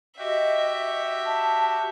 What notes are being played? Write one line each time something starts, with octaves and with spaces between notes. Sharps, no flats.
F#4 G4 D#5 E5
A5